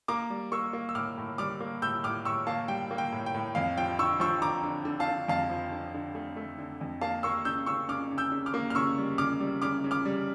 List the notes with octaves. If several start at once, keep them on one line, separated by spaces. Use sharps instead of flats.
A#3 A#5 D6
G3
A#3 C#6 E6
A#3
E6
A2 D6 F6
A2
G3 D6 F6
A#3
A2 E6 G6
A2 D6 F6
A2 C#6 E6
A#3 F5 A5
G3 G5
A#3
G5
A2
G5
A2
F2 F5
F3 G5
D3 C#6 E6
F3 C#6 E6
D3 A#5 D6
D3
D3
F5 A5
D3
F2 F5 A5
F3
D3
D3
A3
A3
D3
F2
A#3 F5 A5
A#3 C#6 E6
C#3 E6 G6
C#3 C#6 E6
C#3 D6 F6
C#3
E6 G6
C#3
D6 F6
A#3
F6
C#3 C#6 E6
G3
C#3 D6 F6
G3
C#3 D6 F6
C#3
D6 F6
G3